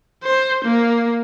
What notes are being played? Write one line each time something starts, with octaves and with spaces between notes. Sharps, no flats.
C5
A#3